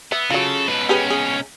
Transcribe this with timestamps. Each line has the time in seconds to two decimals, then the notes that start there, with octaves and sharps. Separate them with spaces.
0.12 B3 E5
0.30 C#3 F#3 F4 A4
0.68 C#2 B2 B4
0.89 C#4 G4 G#4 B4
1.10 G#4